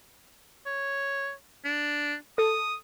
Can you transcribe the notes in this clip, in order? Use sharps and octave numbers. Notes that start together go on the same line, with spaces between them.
C#5
D4
A4 D#6